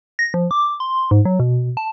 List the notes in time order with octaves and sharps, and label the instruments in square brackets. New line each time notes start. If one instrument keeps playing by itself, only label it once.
[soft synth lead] A#6
F3
D6
C6
G#2
F#3
B2
A5